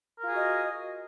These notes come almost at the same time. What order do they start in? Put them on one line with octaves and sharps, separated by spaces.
A#4 F4 G#4 F#4 D#5